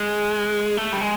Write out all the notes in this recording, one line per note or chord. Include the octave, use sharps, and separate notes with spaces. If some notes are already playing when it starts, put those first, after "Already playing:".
Already playing: G#3
A3
G3
G#3